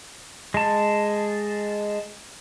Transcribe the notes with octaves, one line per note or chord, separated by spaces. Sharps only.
G#3 A5